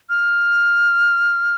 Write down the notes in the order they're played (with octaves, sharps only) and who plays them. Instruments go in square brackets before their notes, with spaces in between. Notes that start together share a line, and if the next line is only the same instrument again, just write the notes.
[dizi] F6